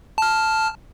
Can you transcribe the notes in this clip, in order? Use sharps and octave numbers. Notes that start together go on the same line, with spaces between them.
A5 F6